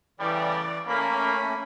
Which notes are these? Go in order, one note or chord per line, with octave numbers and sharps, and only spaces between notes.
A2 C#3 E3 G3 D5
A3 A#3 C#4 B5